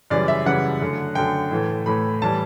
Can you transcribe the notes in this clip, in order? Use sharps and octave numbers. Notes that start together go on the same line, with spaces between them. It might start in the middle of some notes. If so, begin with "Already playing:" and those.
F#2 C#3 E3 G3 D5
E5
F#2 C#3 E3 G3 F#5
F#2 D3 A3
F#2 D3 A3 G5
A2 E3 A3
A2 E3 A3 B5
A2 E3 G3 A5